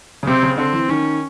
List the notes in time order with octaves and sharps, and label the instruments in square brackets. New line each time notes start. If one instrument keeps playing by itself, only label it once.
[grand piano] C#3
[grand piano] C3 [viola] C4
[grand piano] C#3
[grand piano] D3 [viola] C4
[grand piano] E3
[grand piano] D#3 [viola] C#4